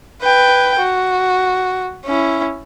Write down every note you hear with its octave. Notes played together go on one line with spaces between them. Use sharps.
B4 G5
F#4
C#4 E4